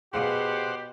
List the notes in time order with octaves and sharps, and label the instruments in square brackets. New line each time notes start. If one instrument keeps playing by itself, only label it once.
[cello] B2 [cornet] G4 [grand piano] G#4 F5 [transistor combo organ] C5 F#5